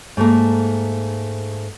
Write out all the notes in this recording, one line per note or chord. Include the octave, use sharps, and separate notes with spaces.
G#2 A3 A#3